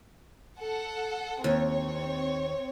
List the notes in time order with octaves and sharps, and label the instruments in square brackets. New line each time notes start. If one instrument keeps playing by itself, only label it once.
[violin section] A4 F#5
[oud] D#2 [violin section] C4 C#5